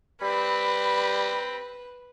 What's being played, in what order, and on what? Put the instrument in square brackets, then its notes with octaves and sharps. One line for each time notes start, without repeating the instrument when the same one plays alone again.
[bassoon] G3 [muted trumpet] C4 [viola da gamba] B4 [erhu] B5